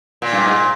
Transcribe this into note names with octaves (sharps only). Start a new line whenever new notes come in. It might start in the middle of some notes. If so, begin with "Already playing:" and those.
A#2
G2
G#2